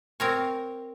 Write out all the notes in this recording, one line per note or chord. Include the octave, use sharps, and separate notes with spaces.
C4 A#4 C#5